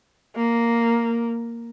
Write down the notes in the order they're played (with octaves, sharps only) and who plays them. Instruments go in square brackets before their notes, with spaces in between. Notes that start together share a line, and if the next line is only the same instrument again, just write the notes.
[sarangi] A#3